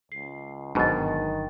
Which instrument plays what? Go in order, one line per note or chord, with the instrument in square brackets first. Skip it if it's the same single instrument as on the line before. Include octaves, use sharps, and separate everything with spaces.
[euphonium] C#2 [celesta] C7
[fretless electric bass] G1 F#3 D4 [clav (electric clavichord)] G#2 B2 [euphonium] D#3 [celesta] A#5 A6